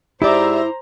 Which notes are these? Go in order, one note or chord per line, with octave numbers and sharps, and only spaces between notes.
G#2 E4 G4 C5 D5 E5 A#5 D6